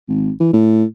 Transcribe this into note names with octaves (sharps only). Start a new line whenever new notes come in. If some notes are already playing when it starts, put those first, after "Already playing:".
G#1
E3
A2